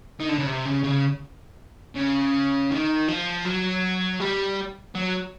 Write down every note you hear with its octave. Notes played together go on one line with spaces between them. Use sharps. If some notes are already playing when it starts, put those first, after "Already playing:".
D#3
D3
C#3
C3
C#3
C#3
C#3
D#3
F3
F#3
G3
F#3